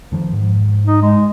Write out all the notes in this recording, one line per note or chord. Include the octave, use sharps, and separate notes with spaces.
F2 D#3 F3
G#2
D#4
G#3